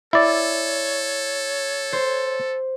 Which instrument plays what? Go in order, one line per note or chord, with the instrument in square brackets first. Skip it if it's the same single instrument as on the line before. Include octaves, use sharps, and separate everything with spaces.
[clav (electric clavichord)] E4 D5 [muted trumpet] A4 [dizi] C#5
[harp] C5